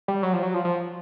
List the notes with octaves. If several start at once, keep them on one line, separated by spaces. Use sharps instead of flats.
G3
F#3
F3
F#3
F3
F3